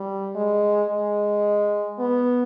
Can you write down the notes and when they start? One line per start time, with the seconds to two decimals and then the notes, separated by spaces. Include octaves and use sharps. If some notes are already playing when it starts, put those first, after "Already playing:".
Already playing: G3
0.35 G#3
0.90 G#3
1.99 B3